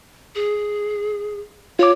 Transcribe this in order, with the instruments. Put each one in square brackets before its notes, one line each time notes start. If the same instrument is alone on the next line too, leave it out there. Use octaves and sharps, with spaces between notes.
[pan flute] G#4
[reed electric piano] F4 D6 [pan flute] C#5